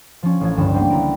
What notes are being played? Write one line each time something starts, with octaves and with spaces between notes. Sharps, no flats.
F3 C#4
A1 A2 E4 G#6
G1 C#2 G2 E4 G6 E7
G3 A#3 B3 C5 F#5 G5
C#2 E4 A#5 D7